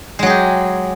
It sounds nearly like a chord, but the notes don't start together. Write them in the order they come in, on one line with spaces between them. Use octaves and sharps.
G#3 F#3 G#4 G4